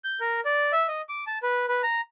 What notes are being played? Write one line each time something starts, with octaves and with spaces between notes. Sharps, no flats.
G6
A#4
D5
E5
D#5
D6
A5
B4
B4
A#5